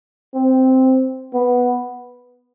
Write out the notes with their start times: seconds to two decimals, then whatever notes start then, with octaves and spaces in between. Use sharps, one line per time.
0.35 C4
1.34 B3